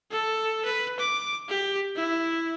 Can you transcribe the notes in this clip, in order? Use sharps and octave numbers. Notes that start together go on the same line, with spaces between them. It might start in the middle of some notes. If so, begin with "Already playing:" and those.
A4
B4
D6
G4
E4